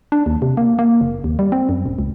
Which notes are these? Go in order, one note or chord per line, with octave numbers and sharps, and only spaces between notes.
D4
D#2
C3
A#3
A#3
F#1
D#2
G3
C4
F#2
D#1
C#2